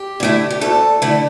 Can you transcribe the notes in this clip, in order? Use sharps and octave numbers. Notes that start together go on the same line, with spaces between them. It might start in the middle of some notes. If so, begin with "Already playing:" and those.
Already playing: G4
D3 A3 E4
G4
D2 A4
D3 A3 E4